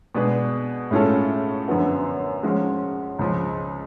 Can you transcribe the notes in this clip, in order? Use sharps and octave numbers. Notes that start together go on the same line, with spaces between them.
B2 G#3 D4 G#4 B4
A2 G#3 C#4 F4 A4
F#2 D3 F3 B3 F#4
F3 G#3 C#4 F#4
C#2 C#3 F3